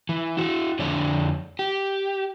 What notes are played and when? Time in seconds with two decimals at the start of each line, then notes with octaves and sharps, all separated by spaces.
0.09 E3
0.37 E4 F#4
0.79 F2 D3 D4 C#5 D5
1.59 G4